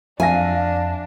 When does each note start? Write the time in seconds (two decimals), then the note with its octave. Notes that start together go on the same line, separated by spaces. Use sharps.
0.20 F2 D4 E5 F5 G#5 A#6